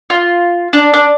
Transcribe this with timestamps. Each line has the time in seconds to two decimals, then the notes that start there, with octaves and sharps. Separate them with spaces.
0.10 F4
0.73 D4
0.94 D4